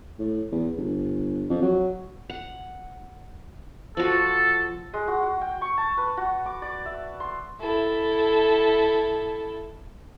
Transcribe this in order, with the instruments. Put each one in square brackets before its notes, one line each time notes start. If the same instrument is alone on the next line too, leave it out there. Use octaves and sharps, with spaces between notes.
[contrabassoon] A2
E2
G1
F2
F#3
[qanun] F#5
[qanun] F3 F#4 [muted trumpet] A4
[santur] G#3
F#4
F#4
G5
C#6
A5
B4
F#4
D6
D5
E5
C6
[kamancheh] E4 A4